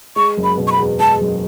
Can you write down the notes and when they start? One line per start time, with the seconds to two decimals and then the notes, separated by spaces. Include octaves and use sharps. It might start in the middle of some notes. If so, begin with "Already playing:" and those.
0.16 G#3 C#6
0.37 F#1
0.44 B5
0.57 B2
0.67 C#6
0.72 B5
0.78 E2
1.00 G#3 A5
1.21 F#1